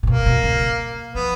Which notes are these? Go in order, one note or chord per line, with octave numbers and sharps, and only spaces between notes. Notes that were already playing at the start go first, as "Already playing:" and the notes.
A#2
B2 A#3
B2
C#3
F3 B3